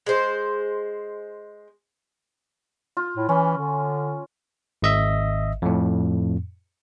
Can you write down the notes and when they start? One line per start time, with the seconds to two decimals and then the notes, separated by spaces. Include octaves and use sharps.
0.06 G#3 C5
2.97 F4
3.17 A2
3.29 E3 C#4
3.58 D3
4.82 G#1 D#5 E5
5.62 F2 A2